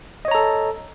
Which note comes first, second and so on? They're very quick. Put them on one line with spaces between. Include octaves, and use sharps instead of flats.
D#5 C#5 A#5 A4